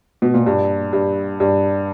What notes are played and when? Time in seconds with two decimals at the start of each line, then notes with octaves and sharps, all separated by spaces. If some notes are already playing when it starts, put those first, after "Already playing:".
0.22 B2
0.34 A#2
0.46 G2
0.93 G2
1.40 G2